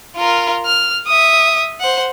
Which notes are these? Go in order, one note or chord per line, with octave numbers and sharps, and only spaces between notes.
F4 A#4
F6
E5 D#6
C5 F#5